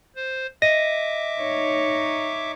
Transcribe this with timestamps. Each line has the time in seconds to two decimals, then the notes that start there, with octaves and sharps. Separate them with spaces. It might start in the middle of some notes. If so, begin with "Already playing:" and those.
0.16 C5
0.62 D#5 E5 D6 A#6 D#7
1.39 D#4 C#5